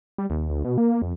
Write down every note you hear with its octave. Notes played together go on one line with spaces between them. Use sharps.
G3
D#2
D2
B2
A#3
F2